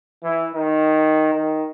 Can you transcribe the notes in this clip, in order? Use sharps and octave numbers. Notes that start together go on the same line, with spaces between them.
E3
D#3
D#3